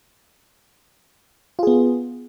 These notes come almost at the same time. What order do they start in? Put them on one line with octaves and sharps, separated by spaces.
F4 G#4 B3